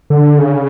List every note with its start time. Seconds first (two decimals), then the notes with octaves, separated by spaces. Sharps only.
0.10 D3
0.38 C#3